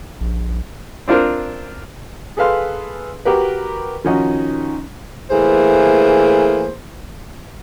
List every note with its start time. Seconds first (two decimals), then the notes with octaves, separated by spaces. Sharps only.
0.21 A#1
1.08 C4 D4 F4 A#4 C5
2.37 G#4 A4 B4 F5 C6
3.25 F#4 G4 A#4 B4
4.04 D#3 F3 C#4 D#4 F#4
5.31 E3 A3 A#3 G#4 C5